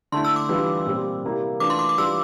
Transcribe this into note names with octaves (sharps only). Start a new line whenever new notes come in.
D3 A3 E4 C6
E6
D6
E3 G3 D4 F4
A#2 G3 C4
C3 G3 A#3 E4
E3 A3 D4 F4 D6
C6
D6
D6
E3 G3 D4 F4 E6